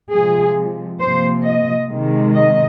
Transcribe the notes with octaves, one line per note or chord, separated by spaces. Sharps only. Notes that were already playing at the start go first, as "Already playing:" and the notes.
C3 F3 G#3 G#4
C3 F3 A#3 C5
D#5
C3 D#3 G#3
D#5